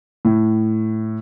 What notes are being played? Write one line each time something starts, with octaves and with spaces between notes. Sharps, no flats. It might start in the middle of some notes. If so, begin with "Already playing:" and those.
A2